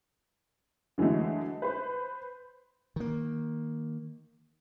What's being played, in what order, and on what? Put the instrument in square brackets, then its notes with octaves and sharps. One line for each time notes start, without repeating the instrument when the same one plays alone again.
[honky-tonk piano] D3 E3 F#3 G#3 A3
B4 C5 B5
[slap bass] D#3 A#3